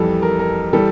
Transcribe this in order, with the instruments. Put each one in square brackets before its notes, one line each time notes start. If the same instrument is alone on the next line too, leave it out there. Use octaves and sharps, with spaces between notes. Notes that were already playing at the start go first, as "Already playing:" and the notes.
Already playing: [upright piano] F2 E3 G3 A4
A#4
A#4
E3 G3 A4